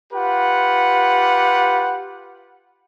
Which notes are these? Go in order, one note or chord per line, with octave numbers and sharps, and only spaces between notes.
F4 G4 B4 F#5